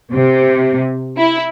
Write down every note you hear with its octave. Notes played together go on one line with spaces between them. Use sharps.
C3
E4